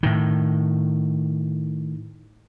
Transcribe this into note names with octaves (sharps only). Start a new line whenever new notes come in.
A2 D#3